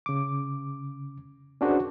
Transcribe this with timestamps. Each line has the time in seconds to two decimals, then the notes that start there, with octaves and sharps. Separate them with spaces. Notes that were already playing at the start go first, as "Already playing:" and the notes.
0.06 C#3 D6
1.61 C#4 D4 F#4 G#4 A#4 C5